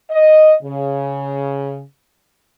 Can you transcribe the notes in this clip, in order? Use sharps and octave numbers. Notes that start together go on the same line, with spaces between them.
D#5
C#3